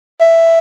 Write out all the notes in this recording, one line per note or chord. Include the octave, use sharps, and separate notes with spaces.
E5